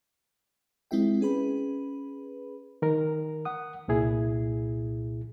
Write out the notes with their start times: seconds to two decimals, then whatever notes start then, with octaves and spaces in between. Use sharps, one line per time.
0.91 G#3 C4 E4 F4 E5 G5
1.21 C#4 G#4 B4 B5
2.82 D#3 A#4
3.45 F#5 D#6
3.88 C2 A#2 E4 G#4